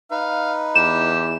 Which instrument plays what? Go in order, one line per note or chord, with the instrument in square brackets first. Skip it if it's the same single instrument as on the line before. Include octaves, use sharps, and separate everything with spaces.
[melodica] D#4 B4 [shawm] F5
[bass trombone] E2 [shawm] G4 [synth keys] E7